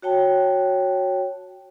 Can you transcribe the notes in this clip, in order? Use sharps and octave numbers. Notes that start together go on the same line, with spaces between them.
F#4 C#5 G5 A5